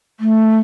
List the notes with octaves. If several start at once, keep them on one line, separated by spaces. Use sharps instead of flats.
A3